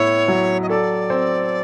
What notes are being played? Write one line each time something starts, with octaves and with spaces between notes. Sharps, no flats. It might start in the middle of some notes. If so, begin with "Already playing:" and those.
Already playing: A2 B3 E4 C#5
F#3
D#5
A4 D5
C4